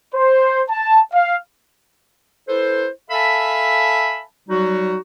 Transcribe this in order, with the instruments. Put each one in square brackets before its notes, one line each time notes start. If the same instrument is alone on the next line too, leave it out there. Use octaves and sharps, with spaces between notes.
[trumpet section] C5
A5
F5
[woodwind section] E4 A4 B4 C5
A4 E5 F5 G#5 A5 B5
F#3 G3 D#4 F#4